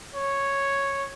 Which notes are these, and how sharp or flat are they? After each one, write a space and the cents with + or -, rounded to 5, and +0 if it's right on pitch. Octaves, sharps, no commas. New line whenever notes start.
C#5 -5